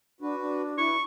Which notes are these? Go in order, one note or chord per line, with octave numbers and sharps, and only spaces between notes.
D4 F#4 B4
D4
E4 B4 C#6